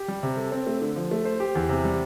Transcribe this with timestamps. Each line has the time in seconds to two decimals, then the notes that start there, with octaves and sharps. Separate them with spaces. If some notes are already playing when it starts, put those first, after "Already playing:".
Already playing: G4
0.08 G3
0.23 C3
0.37 A4
0.52 C4
0.67 A3
0.81 D3
0.96 F3
1.11 A3
1.25 C5
1.40 G4
1.55 E2
1.69 C3
1.85 G3